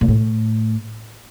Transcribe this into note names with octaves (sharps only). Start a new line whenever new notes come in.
A#2
A2